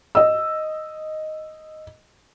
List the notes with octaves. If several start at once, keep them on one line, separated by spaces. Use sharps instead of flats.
D#5 E6